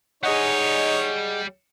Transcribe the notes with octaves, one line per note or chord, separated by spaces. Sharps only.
G3 D#4 G#4 C#5 D#5 F#5 G#5